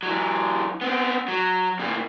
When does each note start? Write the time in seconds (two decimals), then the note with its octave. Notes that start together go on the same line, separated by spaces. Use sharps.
0.03 E3 F#3
0.81 B3 C4
1.28 F#3
1.79 D2 A#2